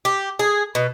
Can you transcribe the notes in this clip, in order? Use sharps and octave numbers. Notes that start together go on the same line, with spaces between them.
G4
G#4
B2